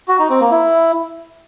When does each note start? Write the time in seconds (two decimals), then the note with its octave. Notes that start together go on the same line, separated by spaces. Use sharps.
0.08 F#4
0.19 D#4
0.30 C4
0.40 A#3
0.51 E4